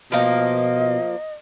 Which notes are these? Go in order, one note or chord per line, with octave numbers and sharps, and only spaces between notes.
B2 F3 A#3 D#5